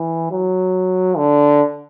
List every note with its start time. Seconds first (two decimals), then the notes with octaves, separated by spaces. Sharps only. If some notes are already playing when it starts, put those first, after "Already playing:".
Already playing: E3
0.31 F#3
1.17 D3